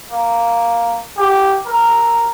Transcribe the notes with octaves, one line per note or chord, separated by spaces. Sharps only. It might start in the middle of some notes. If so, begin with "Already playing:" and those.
A#3
G4
A#4